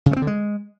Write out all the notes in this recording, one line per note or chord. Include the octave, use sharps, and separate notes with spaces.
C#3
A3
C4
D3
G#3